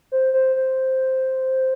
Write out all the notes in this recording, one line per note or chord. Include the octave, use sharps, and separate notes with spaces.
C5
C5
C5